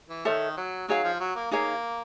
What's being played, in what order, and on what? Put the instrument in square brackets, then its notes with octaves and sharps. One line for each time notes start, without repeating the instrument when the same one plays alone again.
[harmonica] E3
[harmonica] D#3 [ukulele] A4 C#5 E5 A5
[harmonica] F#3
[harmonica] F#3 [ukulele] D#4 G#4 C#5 F5
[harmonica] F3
F#3
A#3
[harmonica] A#3 [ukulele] D#4 G#4 C#5 F5